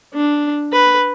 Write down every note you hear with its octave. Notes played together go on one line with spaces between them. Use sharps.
D4
B4